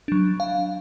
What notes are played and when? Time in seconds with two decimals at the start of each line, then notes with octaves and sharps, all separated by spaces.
0.08 F#3 D4
0.40 F5